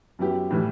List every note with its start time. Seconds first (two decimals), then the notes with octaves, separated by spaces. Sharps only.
0.19 F#2 F#3 B3 E4 G4
0.51 A2 E3 G3